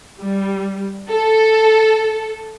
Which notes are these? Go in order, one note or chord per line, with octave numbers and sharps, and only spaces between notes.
G3
A4